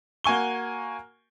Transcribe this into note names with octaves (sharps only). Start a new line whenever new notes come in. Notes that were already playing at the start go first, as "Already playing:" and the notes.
A#3 F#4 G#5 C#6 G7